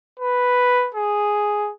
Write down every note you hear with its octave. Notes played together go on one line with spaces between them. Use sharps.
B4
G#4